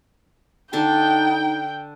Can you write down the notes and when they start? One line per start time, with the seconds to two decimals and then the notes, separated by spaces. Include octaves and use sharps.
0.73 D3 D4 D#4 A4 G5